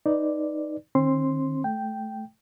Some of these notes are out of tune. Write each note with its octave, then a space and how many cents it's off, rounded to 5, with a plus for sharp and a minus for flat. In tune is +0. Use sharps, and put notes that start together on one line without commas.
D#4 +0 B4 -5 D5 +0
D#3 -30 C4 +35 C6 +0
A3 -15 G5 -5